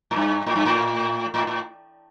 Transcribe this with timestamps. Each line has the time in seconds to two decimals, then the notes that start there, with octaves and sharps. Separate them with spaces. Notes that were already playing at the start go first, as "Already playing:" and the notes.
0.11 A2
0.16 G2
0.46 A2
0.56 G2
0.65 A2
1.34 A2
1.47 A2